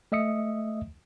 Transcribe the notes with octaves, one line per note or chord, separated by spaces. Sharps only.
A3 D#5 E5 D#6 C#7